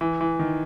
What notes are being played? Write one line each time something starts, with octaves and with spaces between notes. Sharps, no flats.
E3
E3
D#3